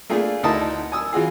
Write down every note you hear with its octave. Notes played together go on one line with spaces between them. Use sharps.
A3 A#3 D4 F4 G#4
D2 D#4 E4 A#4 A5 D#6
G#5 D#6 E6
E3 F4 F#4 G#4